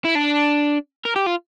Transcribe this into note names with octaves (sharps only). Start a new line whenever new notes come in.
E4
D4
A#4
G4
F4